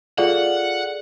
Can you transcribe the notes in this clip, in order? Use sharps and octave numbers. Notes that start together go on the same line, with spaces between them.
F4 G#4 A4 D5 F#5